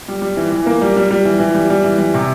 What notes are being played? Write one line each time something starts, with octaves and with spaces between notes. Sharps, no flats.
G3
G3
E3
E3
A#3
G3
G3
G3
E3
E3
G3
G3
E3
G3
C3